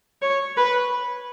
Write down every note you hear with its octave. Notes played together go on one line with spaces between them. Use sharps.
C#5
B4